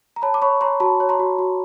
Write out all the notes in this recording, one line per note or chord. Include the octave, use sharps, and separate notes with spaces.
A#5
C#5 A5 B5
D6
C#5 B5 C#6
C#5 A#5 C6
F#4 A5 B5
C#5
A#5 C6
F#4
F#4